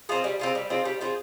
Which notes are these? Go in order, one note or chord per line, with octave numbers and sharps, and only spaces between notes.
C4 F4 G#4
G3
C4 F4 G#4
G3
C4 F4 G#4
G3
C4 F4 G#4